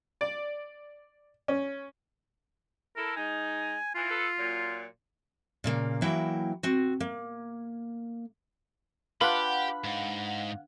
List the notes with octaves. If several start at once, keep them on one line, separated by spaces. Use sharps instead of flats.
D5
C#4
E4 A4 A#4
G#3 D#4 G#5
E3 F4
A4 B4
A#2 F#3
A#2 C#3 A#3
E3 F#3 A#3 E4 G5 A#5
C4 F#4
A#3
D4 F4 G4 B4 F5 F#5 B5
G#2